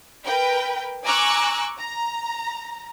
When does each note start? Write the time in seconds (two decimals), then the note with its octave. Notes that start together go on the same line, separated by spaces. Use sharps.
0.25 A#4 B4 G5
1.06 G#5 A#5 C#6 D6 E6 F#6
1.78 A#5